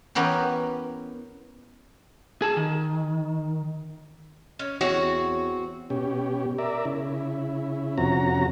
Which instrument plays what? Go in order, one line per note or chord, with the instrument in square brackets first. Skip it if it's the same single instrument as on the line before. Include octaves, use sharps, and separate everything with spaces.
[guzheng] E3 B3 C#4 G4 A#4 B4
[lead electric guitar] G#4 A5
D#3
[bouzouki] C#4
[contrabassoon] E2 [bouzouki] C4 C#5 [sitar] F#4
[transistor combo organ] B2 C#4 G4
A#4 D5 E5
C#3 E4
F2 C3 C#4 F#4 A#5